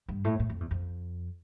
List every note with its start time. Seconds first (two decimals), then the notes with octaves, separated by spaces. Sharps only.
0.09 G2
0.25 A2
0.40 A2
0.50 F2
0.60 E2
0.71 F2